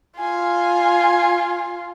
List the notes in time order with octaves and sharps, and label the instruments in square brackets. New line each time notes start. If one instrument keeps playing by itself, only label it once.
[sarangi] F4 [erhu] G#5